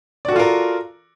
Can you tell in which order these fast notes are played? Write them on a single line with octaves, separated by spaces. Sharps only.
D5 F#4 A4 F4 A#4